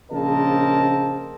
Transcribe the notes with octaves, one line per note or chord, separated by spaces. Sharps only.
A#1 C#3 C4 A#4 D#5 A5